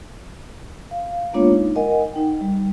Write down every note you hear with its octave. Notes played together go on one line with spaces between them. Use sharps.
F5
G#3 A#3 B3 D4 F4 C#5
D#4
A#4 D#5 F#5 G#5
D#4 G5
G3